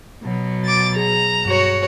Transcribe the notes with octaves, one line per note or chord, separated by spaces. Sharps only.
B2 F#3
D6 A6
G#4 A#5
G2 F#4 C#5